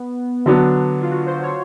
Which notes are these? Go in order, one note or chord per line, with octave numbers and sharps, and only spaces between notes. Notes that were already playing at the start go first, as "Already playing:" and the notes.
Already playing: B3
D3 F#3 B3 D4
F4
F#4
C5
C#5